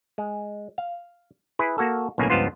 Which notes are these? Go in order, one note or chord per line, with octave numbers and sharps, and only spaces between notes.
G#3
F5
E4 G#4 B4
A#3 F#4 A4
B1 A2 C#3 A#3 G#5
C#2 G2 F3 B3 F4 C5